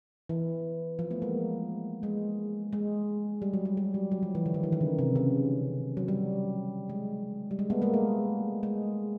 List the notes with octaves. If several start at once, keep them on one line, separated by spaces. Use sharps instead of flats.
E3
F3
A3 B3
G#3 A#3
G#3
G#3
G3
F#3
G3
G3
F#3
F#3
F3
E3
D3
D#3
E3
D#3
C#3
C3
C#3
F#3
G3
G#3
G3
G#3
A3 B3
G#3 A#3
A3
G#3